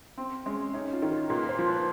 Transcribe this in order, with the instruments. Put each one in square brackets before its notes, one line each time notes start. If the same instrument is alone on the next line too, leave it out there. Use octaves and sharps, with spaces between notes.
[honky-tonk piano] C4
[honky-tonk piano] G#3 [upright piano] C#4
[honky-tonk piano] C#4 [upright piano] D#4
[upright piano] F4
[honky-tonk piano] D#3
[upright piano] F4
[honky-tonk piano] A#2 [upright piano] B4
[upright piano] C5
[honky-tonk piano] F3
[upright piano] B4